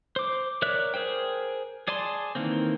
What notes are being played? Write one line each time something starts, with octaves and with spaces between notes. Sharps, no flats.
C5 D6
A#4 C#5 D5 E5 F#6
G#4 A#4 C5 G5
G#4 D5 G#5 A5 C6
D#3 E3 A#3 C4